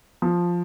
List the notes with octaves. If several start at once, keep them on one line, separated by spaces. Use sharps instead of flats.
F3